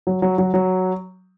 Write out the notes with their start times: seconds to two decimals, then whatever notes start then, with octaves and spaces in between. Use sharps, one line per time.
0.07 F#3
0.22 F#3
0.38 F#3
0.54 F#3